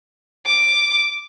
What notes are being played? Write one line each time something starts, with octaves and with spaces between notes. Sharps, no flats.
D6